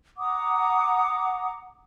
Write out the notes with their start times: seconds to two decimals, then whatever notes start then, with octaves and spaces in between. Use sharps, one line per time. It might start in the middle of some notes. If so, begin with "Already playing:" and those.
0.17 F#5 A#5 D6 D#6